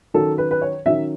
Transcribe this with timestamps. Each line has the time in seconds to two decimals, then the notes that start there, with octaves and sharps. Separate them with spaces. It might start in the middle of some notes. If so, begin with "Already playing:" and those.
0.14 D#3 F#3 C#4 A4
0.38 B4
0.51 B4
0.62 C#5
0.86 D#3 F#3 C#4 E5